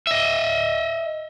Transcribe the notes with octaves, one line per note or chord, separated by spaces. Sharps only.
D#5 E5